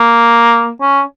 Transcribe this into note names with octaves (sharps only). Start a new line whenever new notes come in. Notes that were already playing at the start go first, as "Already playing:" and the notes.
Already playing: A#3
C#4